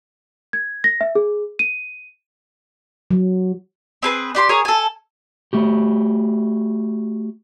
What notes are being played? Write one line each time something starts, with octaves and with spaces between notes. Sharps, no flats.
G#6
A#6
E5
G#4
D#7
F#3
C4 G#4 B4
D4 G4 C6
G#4 A#4 C#5
A4 G#5
A3 F#4 G4